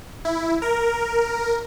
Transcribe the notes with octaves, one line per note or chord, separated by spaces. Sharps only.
E4
A#4